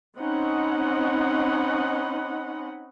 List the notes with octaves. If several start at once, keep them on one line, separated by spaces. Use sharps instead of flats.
C4 C#4 D#4 D#5 F#5 B5